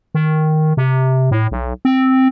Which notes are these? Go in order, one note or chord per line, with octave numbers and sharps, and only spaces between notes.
D#3
C3
A2
B1
C4